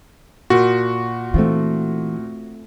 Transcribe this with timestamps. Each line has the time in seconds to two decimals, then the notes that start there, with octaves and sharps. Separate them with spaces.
0.50 A#2 F#4
1.34 E3 A3 C4 F4